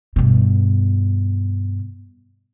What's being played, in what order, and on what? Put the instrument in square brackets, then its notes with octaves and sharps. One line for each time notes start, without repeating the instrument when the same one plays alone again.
[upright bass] G2 B2